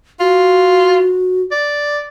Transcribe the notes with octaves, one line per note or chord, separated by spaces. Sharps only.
F4 F#4
D5